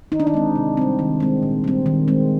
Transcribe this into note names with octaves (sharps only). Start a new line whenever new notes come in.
D#3 D#4
D4
D#4
G#3 C4
C3
G3 C4
D#3
G#3 C4
A#2
G3 C4
D#3
G#3 C4